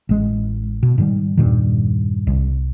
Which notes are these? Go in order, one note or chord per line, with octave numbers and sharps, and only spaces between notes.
A1 G#3
B2
G#2 D#3 G3
E2 G2 A#2 D#3
C2